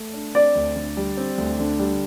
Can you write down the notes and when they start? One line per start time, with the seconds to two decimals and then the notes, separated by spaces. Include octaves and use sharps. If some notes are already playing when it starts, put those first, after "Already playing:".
Already playing: A3
0.13 D4
0.35 C4 D5
0.55 D2
0.76 D3
0.97 G3
1.17 C4
1.38 D2
1.59 D3
1.79 G3